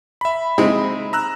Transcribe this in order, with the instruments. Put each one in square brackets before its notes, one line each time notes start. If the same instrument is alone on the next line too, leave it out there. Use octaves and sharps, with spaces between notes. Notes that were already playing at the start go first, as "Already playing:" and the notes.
[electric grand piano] E5 B5
[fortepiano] G#3 C4 D#4
[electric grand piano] A#5 E6 F#6